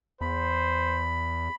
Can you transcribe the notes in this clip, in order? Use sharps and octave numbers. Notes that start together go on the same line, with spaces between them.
E2 C5 B5